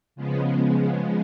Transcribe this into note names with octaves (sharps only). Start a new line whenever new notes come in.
C#3 F3 G#3 B3